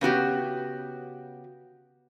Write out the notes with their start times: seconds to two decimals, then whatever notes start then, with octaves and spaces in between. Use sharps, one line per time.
0.01 C#3 B3 F#4 G4